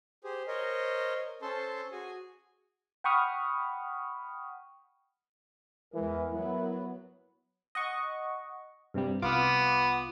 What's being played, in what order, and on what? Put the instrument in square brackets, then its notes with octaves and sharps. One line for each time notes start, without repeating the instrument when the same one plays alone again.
[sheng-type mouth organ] G4 G#4 C5
A#4 C5 C#5 D#5
C#4 A4 C5 A5 C6
F#4 G#4 G#5
[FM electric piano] F#5 G5 B5 C#6 D#6 F6
[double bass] E2 G#3 [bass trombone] E3 [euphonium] A#4
[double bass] F#3 B3 [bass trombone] E4
[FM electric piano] D#5 F#5 C#6
G2 C3 G3
[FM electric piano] C2 F4 D6 [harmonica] B3